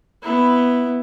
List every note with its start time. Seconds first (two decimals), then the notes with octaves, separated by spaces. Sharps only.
0.23 B3 E4